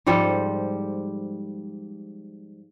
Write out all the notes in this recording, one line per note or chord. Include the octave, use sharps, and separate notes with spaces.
G#2 F3 G3 A4